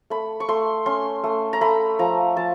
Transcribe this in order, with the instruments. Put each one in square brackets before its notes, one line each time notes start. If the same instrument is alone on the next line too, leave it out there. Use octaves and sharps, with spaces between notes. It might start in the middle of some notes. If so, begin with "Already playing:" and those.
[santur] A3 B5
C#6
A3 C6
C#4 C6
A3
A#5
A3 B5
F3 A#5
F3 A5